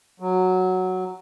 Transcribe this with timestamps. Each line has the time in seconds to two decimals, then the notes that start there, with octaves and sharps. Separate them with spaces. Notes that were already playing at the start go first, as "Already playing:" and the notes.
0.20 F#3